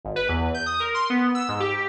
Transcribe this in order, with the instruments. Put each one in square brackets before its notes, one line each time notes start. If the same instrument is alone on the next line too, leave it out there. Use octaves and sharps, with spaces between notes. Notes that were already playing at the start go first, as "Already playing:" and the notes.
[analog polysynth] G#1
B4
E2
G6
D#6
A#4
C6
B3
E6
G#2
G4